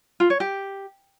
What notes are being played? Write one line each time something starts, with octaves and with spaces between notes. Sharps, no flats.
F4
C#5
G4